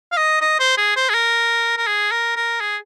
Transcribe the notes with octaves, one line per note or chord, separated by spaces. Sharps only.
F5
D#5
D#5
C5
G#4
C5
G#4
A#4
A#4
G#4
A#4
A#4
G#4